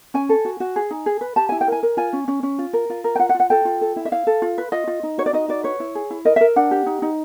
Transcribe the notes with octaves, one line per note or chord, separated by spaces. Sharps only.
C#4 G#5
A4
F#4
F#4
G#4
D#4
G#4
B4
G4 A5
E4 G#5
G5
A#4 G#5
A#4
F4 G#5
C#4
C#4
C#4
F4
A#4
F4
A#4
G5
F4 F#5
F#5
F4
F#5
A4 G5
F4
A4
E4
E5
E4 F5
A4
F4
B4
F4 D#5
F4
D#4
F#4 C#5
D5
D#4 D#5
F#4 D5
B4 C#5
E4
G#4
E4
A#4 D#5
E5
A#4
D4 F#5
G4
D#4
D#4